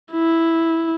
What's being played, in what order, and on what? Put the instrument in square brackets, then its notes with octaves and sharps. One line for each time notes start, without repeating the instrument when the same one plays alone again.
[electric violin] E4